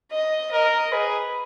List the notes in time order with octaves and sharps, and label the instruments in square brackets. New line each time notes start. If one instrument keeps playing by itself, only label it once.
[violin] D#5
[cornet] A#4 [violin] D#5
[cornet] G#4 [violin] B4